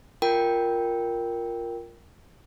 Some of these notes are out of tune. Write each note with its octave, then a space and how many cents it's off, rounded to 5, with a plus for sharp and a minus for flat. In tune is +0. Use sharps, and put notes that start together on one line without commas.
F4 +0 A#4 +0 G5 +0